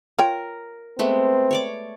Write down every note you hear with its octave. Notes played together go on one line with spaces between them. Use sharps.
F4 A#4 C#5 G5
G#3 A3 B3 C4
C#5 D5 D6